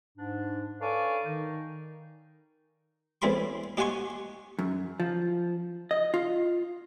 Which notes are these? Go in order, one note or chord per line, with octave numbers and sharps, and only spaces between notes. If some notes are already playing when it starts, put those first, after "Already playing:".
G#2 D4
A4 B4 C#5 D5 F5 G#5
D#3 D#4
E2 A2 C4 E4 B5 C6
D#4 G4 F#5 G#5 C6 C#6
F#2
F3
D#5
F4